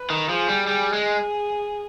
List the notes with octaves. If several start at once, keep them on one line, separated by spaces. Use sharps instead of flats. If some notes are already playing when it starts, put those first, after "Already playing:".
Already playing: B4
D#3
F3 G#4
G3
G3 G#4
G#3